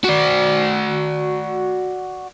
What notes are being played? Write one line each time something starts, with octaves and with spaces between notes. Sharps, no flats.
F#4 D5